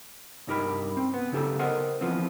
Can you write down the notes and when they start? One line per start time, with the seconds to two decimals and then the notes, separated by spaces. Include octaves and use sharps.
0.47 C2 G2 D#4 G4 A#4 B5
0.97 C4
1.14 B3
1.32 C#3 D#4 G4 A4
1.59 A#4 C5 D#5 F#5
2.01 E3 F3 B3 C4